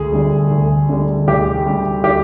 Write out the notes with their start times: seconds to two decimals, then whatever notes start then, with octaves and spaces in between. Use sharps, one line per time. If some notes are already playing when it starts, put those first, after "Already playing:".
Already playing: D2 G#4
0.12 D3 G3
0.51 D2
0.89 D3 G3
1.28 D2 G4
1.66 D3 G3
2.04 G4